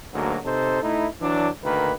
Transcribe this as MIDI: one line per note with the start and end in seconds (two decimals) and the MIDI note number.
0.14 0.38 38
0.14 0.38 44
0.14 0.38 54
0.14 0.38 58
0.45 0.82 48
0.45 0.82 63
0.45 0.82 69
0.45 0.82 72
0.83 1.07 57
0.83 1.07 63
0.83 1.07 64
1.21 1.49 52
1.21 1.49 54
1.21 1.49 62
1.64 1.93 38
1.64 1.93 51
1.64 1.93 58
1.64 1.93 71